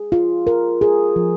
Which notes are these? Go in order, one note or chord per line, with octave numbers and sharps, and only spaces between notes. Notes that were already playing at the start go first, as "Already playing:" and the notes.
Already playing: G#4
F4
A#4
G#4
F3